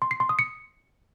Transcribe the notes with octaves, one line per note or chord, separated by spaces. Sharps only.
C6
C7
C6
D#6
C#7